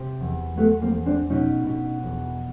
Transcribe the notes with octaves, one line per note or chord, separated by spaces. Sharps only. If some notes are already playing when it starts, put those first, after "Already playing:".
Already playing: C3
E2
E2 A3 B3
A#3 C4
E2
C4 D4
B2 C#4 D#4
B2
E2